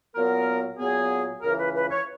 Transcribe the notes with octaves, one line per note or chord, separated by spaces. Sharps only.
A#2 F#3 B3 A#4
A#2 F#3 B3 G#4
C#2 C#3 E3 A#4
B4
B4
C#5